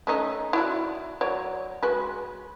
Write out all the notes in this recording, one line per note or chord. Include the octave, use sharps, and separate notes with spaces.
A3 C#4 D#4
E4 F#4 D5
F#3 C#5 D5
G#3 F#4 B4